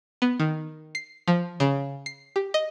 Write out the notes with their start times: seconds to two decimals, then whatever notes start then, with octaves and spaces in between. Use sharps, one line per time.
0.22 B3
0.40 D#3
0.95 C7
1.28 F3
1.60 C#3
2.06 C7
2.36 G4
2.54 D#5